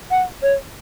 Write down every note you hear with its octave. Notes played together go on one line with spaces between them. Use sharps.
F#5
C#5